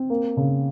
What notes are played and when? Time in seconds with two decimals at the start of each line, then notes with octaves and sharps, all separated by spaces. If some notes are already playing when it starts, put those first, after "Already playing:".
Already playing: C4
0.10 A#3
0.37 C#3